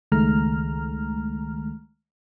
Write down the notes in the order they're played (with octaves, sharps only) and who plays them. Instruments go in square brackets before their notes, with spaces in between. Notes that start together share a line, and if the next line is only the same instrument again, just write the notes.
[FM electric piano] C#2 D#3 G#3 A3 A#5 F6